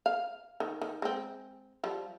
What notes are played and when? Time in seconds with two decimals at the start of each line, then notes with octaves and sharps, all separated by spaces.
0.06 F5
0.60 D#3
0.81 D#3
1.02 G#3 C4
1.84 F3 G3